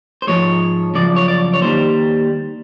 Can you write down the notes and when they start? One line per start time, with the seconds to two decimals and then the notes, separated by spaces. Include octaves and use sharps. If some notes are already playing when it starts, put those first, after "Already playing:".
0.22 C5
0.27 G#2 F3 G#3 C#5
0.95 F#2 C#3 F3 D5
1.16 C#5
1.28 D5
1.54 C#5
1.61 D#2 D#3 G3 C5